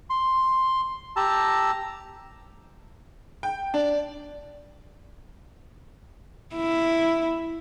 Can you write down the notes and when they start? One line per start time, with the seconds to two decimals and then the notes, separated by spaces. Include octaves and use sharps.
0.10 C6
1.16 G4 A5 A#5 E6
3.43 G5
3.74 D4 D5
6.55 E4